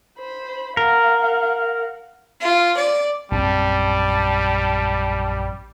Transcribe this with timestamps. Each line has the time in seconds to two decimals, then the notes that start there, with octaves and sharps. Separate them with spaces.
0.18 C5 B5
0.77 A#4 F5 F#5
2.40 F4
2.78 D5
3.31 A#1 F#2 G3 C4 A5